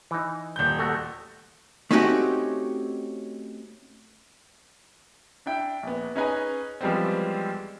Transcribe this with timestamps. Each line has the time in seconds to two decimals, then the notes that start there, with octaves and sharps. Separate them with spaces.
0.11 E3 D#4
0.56 D#1 G6
0.79 A3 F#4
1.91 A3 C4 C#4 D#4 F#4 G4
5.46 D4 E4 G5
5.83 A#1 B3
6.16 C#4 D#4 G#4 B4 G#5 A#5
6.81 E3 F3 G3 G#3 B3 C4